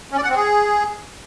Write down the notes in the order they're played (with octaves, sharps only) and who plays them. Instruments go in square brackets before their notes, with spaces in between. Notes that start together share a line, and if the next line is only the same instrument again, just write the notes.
[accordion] C#4
D5
F#5
C4
G#4